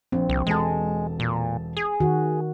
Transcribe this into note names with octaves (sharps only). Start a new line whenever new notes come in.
A#1 C4
C2
E1 G#3 A4 A5
A#2
G#4
D#3 F#4